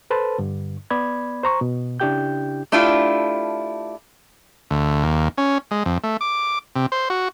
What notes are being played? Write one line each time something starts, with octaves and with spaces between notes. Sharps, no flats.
A4 B4 C5 A5
G2 D3
B3 D5 B5 G#6
C5 A#5 C#6
B2
C#3 D4 E4 G4 G5 G6
A3 D4 E4 F4 G4
D2
D#2
C#4
G#3
F2
A3
D6
C3
C5
F#4